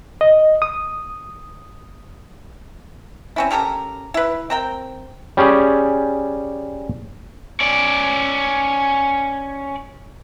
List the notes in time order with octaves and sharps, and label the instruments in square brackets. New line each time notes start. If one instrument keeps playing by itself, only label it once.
[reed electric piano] D#5
D#6
[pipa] C4 C#4 E4
C#4 G4 A4 A#4
E4 B4
C4 A#4 G5
[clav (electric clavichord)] G3 C#4 G4 G#4
[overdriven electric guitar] C#4 D5